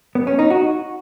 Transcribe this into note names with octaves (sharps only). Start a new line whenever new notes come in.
B3
C#4
D#4
F#4